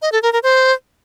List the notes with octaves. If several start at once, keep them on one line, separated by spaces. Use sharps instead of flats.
D#5
A4
A#4
A#4
C5